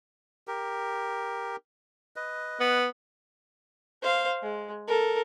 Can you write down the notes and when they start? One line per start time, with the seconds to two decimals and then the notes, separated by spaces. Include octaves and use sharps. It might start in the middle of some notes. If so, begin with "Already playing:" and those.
0.47 G4 A#4
2.16 B4 D#5
2.60 B3
4.02 C5 F5
4.43 G#3
4.87 A4 A#4